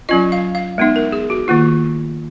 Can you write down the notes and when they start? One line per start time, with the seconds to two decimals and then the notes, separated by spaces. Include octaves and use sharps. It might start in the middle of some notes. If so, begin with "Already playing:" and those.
0.09 F#3 C#4 F4 D#5
0.32 F5
0.55 F5
0.78 G#3 B3 D#4
0.96 A#4
1.12 G#4
1.30 F#4
1.48 D#3 A#3 F4